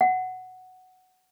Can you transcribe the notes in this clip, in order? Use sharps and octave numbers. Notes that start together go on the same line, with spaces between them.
F#5